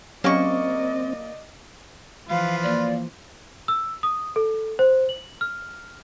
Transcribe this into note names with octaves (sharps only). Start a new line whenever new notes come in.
F#3 A#3 C4 C#4 G4 D5 D#5 C#6
E3 F3 F4 B4 F5
A#3 D5
E6
D#6
A4
C5
F#7
F6